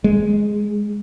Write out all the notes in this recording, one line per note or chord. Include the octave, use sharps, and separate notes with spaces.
G#3